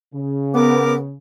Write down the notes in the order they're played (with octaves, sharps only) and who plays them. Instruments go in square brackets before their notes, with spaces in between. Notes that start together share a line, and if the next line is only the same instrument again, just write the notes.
[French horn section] C#3
[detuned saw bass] B3 [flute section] A#4 D6